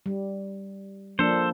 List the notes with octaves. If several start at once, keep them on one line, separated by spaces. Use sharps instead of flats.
G3
F3 A#3 D4 A4 C5